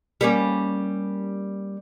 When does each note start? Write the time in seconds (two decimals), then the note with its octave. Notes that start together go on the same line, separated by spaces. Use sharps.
0.21 G3 A#3 C#4